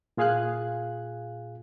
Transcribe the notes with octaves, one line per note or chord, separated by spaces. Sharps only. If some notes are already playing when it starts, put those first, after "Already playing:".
A#2 F4 G#4 F5 G#5 F#6